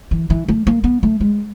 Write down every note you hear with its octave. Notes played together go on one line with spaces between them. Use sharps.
E3
E3
A3
A#3
B3
A3
G#3